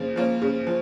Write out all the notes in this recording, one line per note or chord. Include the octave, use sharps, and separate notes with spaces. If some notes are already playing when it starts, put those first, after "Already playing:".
Already playing: C#3 F3 A#3
F3 A#3 C#4
C#3
F3